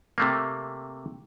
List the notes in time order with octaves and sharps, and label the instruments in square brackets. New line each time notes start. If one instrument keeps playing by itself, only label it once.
[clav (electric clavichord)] C3 A3 A#3